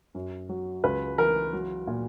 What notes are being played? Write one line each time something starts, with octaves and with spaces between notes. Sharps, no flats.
F#2
F#3
C#2 B4
E3 A#4
F#3
A#2